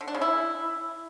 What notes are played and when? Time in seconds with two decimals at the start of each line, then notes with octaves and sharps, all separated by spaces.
0.01 D3
0.08 D4
0.15 C#3
0.21 E4